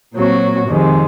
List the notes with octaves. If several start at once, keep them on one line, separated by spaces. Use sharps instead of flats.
A#2 F#3 C4 F#4
F2 C3 D#3 G#3